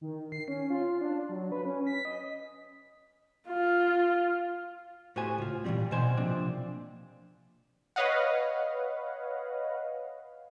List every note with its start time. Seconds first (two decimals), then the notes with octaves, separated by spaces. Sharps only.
0.01 D#3
0.32 C7
0.48 C#4
0.70 F4
1.01 D4
1.29 F#3
1.52 B4
1.65 C#4
1.87 B6
2.05 D#5
3.49 F4
5.16 A2 F#4 G4 C5 G#5
5.38 C#2 F4
5.64 A#2 E3 F#3 G3 C4
5.91 B2 E3 C5 G#5 C6
6.17 C3 F3 A#3 C4 D4
7.96 B4 C#5 D#5 F5 F#5